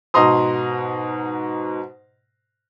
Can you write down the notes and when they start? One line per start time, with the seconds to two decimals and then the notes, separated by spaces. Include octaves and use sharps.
0.14 G#2 B2 D#5 A#5 C6 D#6